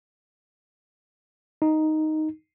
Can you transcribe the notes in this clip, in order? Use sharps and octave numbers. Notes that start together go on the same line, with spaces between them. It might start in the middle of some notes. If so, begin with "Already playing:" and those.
D#4